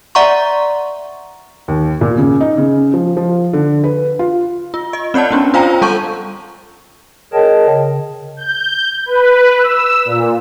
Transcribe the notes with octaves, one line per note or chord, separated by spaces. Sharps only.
D5 E5 F#5 A#5 C6 C#6
D#2
A#2
C#3
D#4
C#3
F3
F3
D3
B4
F4
F4
D#5
C4 C#5 D5 F#5 A5
B3 C#4 D4
F4 C5 F5 G5 G#5 A#5
G3 A4 A5 C#6 G6 D#7
G#4 A#4 C#5 D#5 G5 A5
C#3
G6
B4
E6
A#2